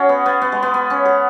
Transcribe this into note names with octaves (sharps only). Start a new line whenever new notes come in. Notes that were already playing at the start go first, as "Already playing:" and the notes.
Already playing: C#4 F#4 G#4
B3
B3
B3
G#3
B3
B3
C#4
G#4